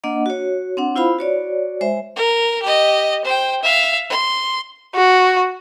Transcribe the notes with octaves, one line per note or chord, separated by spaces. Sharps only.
A#3 D4 D#5 F#5
F#4 C#5
C4 D4 F#5
E4 F4 C5 F5 B5
F#4 C#5 D5
G#3 C5 E5
A#4
G4 D#5
C5 G5
E5 F5
C6
F#4